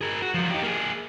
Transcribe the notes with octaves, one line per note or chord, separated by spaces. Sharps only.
G#4 A#4
F#4
F3 F#3
D#4 G4
A#3 G#4